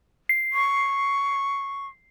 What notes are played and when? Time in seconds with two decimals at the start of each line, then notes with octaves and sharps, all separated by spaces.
0.29 C7
0.53 C#6